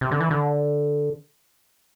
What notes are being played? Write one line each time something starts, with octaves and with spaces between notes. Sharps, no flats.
C3
D3
E3
D3